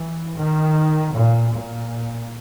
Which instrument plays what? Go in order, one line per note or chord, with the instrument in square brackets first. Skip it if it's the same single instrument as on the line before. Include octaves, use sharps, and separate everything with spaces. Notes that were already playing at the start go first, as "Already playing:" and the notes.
Already playing: [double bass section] E3
D#3
A#2
A#2